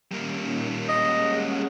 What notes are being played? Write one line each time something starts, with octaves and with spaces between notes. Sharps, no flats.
A#2 D#3 G3 A#3 C#4
G#3 C#4 D#5 F#5